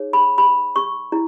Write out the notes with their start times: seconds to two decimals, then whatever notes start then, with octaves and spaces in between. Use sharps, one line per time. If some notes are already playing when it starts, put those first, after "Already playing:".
Already playing: D#4 G#4 C#5
0.13 B5
0.38 B5
0.76 C#6
1.12 E4